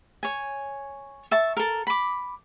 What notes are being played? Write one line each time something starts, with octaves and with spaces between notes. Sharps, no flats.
C#5 G#5
E5 A5 C#6
A4 A#4
B5 D6